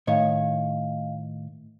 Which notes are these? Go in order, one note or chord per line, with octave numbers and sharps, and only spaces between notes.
A2 D#3 C#5 D#5 F5